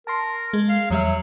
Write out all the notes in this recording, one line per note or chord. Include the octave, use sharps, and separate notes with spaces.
A#4 A5 C6
G#3
F5
E2 F#3 G3 E5